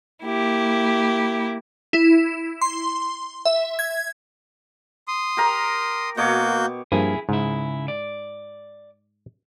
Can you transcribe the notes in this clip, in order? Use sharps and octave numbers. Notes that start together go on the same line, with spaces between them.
A#3 E4 G4
E4
C6
E5
G#6
C6 D#6
G4 A#4 A#5
B2 A#3 F#4 C#5 D6 G6
G2 F3 A#3 E4 G#4
G#2 C#3 E4
D5